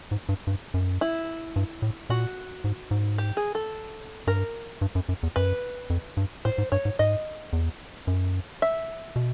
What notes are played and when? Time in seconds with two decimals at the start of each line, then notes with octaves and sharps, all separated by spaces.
0.11 G#2
0.29 G2
0.47 G2
0.74 F#2
1.01 E4
1.56 G2
1.82 A2
2.10 A#2 F#4
2.64 G#2
2.91 G#2
3.18 G4
3.37 G#4
3.55 A4
4.27 G2 A#4
4.81 G2
4.95 F#2
5.09 F#2
5.23 E2
5.36 F#2 B4
5.90 F2
6.17 G2
6.45 A2 C5
6.58 G#2
6.72 G2 C#5
6.85 G#2
6.99 G#2 D#5
7.53 E2
8.07 F#2
8.62 E5
9.16 B2